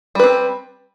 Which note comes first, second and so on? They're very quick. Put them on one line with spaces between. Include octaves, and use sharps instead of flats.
G3 B4 C4